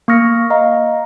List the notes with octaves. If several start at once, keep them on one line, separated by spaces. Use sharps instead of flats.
A#3 C#6 D#6 F6 A#6 C#7
D#5 F5 A#5